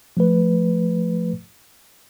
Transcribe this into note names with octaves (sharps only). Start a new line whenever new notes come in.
F3 A3 B4